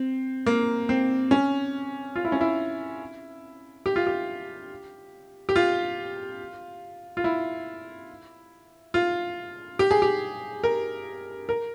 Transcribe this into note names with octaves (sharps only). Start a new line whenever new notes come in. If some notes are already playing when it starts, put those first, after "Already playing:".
Already playing: C4
A#3
C4
C#4
F4
E4
C#4
E4
G4
F4
G4
G4
F4
F4
E4
F4
G4
G#4
G4
A#4
A#4